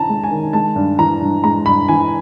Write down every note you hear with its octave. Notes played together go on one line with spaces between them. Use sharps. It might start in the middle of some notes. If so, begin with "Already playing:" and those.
Already playing: D#3 C#4 E4 A5 A#5
G#3
G#5
D#3
G#3 A5
G2
E3 A#5
G2
G#3 A#5
G2 B5
E3 G#5